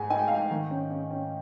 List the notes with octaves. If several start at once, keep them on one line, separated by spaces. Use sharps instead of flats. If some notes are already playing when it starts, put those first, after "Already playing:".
Already playing: G#2 G#3 G#5
D#4 G#5
G5
D#4 F5
G5
D#3
C#4
C#4
C#4